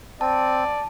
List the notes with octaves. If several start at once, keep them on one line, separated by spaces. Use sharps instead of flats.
C4 D5 A5